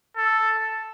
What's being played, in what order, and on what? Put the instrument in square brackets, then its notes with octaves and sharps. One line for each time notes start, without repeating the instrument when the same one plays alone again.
[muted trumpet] A4